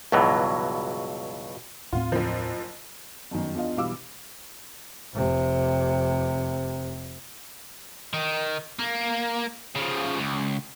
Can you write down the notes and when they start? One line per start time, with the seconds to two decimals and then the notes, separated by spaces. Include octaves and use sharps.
0.12 C#2 G2 B2 E3 F#3
1.93 D#2 A2 C4 F4
2.12 F#1 F3
3.31 G1 F#2 D#3
3.54 E2 D4 F4 D#5 F5
3.76 B1 E3 G3 F5 D6 E6
5.13 F1 C3
8.13 D#3
8.79 A#3
9.76 C#3 F3
10.19 C#2